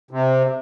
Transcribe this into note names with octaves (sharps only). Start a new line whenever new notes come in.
C3